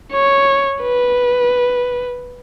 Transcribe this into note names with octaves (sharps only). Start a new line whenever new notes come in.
C#5
B4